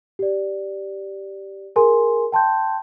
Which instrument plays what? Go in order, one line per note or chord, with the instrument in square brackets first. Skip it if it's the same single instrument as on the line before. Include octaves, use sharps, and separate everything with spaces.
[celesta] G4 D5
G#4 A#4 G#5 C6
G5 A5 C6 G6